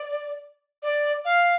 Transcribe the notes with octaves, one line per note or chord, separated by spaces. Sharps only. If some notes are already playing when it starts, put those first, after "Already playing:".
Already playing: D5
D5
F5